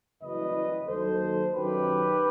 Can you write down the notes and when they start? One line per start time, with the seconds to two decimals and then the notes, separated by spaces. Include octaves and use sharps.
0.22 F#1 F#2 E3 G3 B4 D#5
0.87 D#2 D#3 F#3 A4 C5
1.54 F#2 D#3 F#3 G4 B4